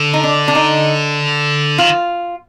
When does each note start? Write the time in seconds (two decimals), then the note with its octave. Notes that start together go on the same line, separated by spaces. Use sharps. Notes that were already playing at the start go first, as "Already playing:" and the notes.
Already playing: D3
0.13 D#4
0.23 D4
0.48 D4
0.55 D#4
1.78 D#3 F4